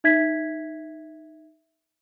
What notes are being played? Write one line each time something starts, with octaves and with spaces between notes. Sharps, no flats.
D#4 E5 G#6 B6